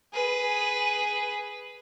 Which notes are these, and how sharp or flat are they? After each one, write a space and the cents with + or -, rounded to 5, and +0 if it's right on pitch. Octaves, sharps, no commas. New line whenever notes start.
G#4 +0 B4 +0